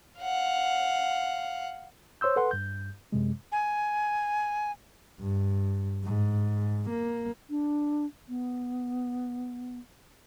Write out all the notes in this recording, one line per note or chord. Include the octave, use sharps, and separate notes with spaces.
F5 F#5
C5 C#5 C6 E6 G6
A4 B4 F#5 C6
G2 G6
F#2 C3 G#3
G#5
G2
G#2
A#3
D4
B3